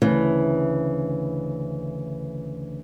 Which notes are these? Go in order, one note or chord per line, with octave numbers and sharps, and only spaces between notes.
D2 C#3 E3